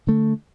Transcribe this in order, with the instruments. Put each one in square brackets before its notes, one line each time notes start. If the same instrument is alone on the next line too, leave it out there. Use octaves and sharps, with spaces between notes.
[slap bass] D3 A3